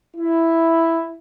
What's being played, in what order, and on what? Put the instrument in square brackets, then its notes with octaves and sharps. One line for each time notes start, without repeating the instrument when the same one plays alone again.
[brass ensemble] E4